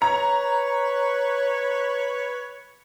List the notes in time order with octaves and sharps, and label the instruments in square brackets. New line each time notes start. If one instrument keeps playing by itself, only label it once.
[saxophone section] B4 C#5 [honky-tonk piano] A#5